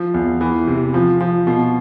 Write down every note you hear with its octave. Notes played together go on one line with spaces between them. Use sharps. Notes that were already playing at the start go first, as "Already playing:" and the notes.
Already playing: F3
E2
E3
C3
F3
F3
B2